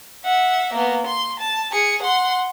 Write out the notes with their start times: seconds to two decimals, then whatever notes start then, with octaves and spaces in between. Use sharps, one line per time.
0.25 E5 F#5
0.73 A#3 B3
1.06 C6
1.39 A5
1.72 G#4 C#7
2.02 F#5 C6